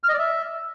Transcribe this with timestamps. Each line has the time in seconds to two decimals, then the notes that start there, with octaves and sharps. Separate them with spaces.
0.04 F6
0.09 D#5
0.14 D5
0.19 E5